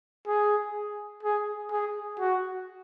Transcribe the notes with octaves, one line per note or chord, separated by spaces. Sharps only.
G#4
G#4
G#4
F#4